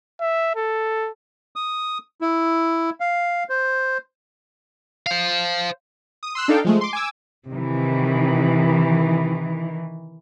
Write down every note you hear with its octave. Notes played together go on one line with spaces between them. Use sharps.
E5
A4
D#6
E4
F5
C5
C5 F5
D#6
C6 E6 F#6
D4 D#4 A4 F5 G5
F3 G#3 A3
C6 D6
G#5 D6 E6
C3 D#3 E3